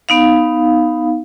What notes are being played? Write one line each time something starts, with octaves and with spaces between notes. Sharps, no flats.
B3 D#4 F5